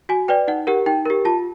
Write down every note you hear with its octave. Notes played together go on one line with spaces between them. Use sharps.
F#4 G#5
B4 D5 G5
D#4 F#5
G4 A#4 F#5
D#4 G5
G4 A#4
F4 A5